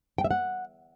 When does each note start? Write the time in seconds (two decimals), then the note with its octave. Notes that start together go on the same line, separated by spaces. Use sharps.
0.18 G5
0.24 E5
0.31 F#5